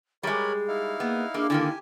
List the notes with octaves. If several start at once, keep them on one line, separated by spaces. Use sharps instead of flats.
G3 G#3 G#4 A#4 C#5 B5
D#4 E4 F5
A#3 B3
A#3 D4 G#4
D3 D#3 A#3 E4 G4 G#5